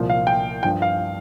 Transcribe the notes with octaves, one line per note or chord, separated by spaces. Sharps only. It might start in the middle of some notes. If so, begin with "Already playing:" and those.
Already playing: C2 A#2 F3
F5
G5
G2 F3 G5
F5